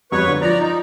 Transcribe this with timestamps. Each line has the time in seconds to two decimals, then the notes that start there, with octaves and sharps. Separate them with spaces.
0.12 F2 F#3 G3 B4 C#5 C#6
0.27 D3
0.41 F3 D5 A#5 A#6
0.60 D#4